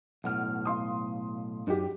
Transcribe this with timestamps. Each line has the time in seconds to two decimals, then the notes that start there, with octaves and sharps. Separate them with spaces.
0.24 B1 A2 F#5 F6
0.65 F5 C6 D#6
1.67 F#2 D#4 F#4 G4